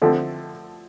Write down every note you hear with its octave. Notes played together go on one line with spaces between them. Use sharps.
D3 F3 A3 C4